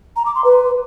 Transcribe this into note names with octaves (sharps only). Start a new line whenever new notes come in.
A#5
D6
C6
B4